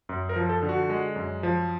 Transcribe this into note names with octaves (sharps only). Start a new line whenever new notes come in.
F#2
A#4
F3
A4
D3
F#4
G#3
F#2
F3